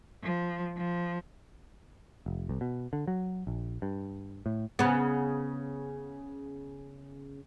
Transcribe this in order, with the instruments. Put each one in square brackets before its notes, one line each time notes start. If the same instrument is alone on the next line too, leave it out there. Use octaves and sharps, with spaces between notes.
[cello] F3
F3
[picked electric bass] F1
C2
B2
D3
F#3
A#1
G2
A2
[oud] C#3 B3